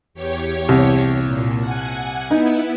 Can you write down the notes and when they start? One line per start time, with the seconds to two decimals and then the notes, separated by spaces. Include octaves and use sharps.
0.14 E2 G4 C#5
0.69 C2
1.23 A#2
1.60 F#5 G#5
2.31 B3 D#4 E4